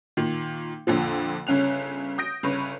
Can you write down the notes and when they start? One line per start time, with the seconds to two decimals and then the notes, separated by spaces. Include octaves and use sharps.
0.17 A#2 D#3
0.87 F2 A#2 D3 F3
1.47 G1 C#3 C#4 F#6 F7
2.18 D#6 G6 A#6 D7
2.43 G1 C#3 B4 C#5